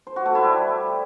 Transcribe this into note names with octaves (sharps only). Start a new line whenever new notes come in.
C5
F#4
A3
E4
G3